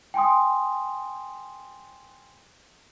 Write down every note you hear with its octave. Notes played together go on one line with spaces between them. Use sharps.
G5 G#5 C6 D#6